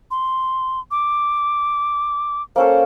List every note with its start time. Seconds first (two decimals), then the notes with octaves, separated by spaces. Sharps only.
0.11 C6
0.91 D6
2.56 A#3 C#4 A4 C5